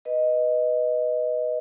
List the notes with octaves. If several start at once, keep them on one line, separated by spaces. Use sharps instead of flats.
B4 D#5